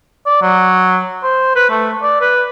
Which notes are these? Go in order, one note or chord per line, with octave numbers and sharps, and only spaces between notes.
D5
F#3
C5
B4
A3
D5
B4